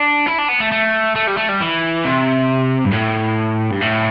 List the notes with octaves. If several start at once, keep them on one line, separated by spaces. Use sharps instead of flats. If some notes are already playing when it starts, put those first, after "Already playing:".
Already playing: D4
E4
D4
B3
A3
A3
A3
G3
A3
G3
E3
C3
G2
A2
G2
A2